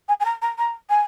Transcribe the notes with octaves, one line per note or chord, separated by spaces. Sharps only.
G#5
G#5
A#5
A#5
A#5
G#5